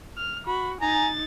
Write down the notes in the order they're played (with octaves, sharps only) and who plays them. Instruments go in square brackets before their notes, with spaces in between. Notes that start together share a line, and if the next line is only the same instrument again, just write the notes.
[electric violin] F6
[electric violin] F#4 [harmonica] B5
[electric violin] D#4 A6 [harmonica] G#5 A#5